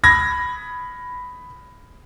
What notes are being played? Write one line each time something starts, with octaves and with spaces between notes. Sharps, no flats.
B5 G#6 A#6